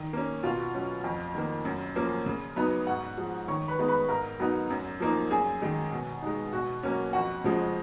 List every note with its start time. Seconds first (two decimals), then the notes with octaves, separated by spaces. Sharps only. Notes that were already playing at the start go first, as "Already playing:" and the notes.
Already playing: D#3
0.13 A#3 C#4
0.43 B2 F4 F5
0.74 F#3 C#4
1.04 F2
1.35 D#3 A#3
1.65 F#2
1.96 F3 A#3 C#4
2.26 C#3
2.56 F#3 B3 D#4
2.87 G#2 F#4 F#5
3.17 F3 G#3
3.48 D#3 C#5 C#6
3.68 B4 B5
3.79 G#3 B3 D#4
3.88 B4 B5
4.08 G#2 A#4 A#5
4.39 F#3 B3 D#4
4.70 F#2
5.00 F3 A#3 D#4
5.31 F#2 G#4 G#5
5.62 D#3 G#3 D#4
5.91 B2
6.22 G#3 D#4
6.53 B2 F#4 F#5
6.83 F#3 A#3 C#4
7.13 F2 F#4 F#5
7.44 C#3 F3 G#3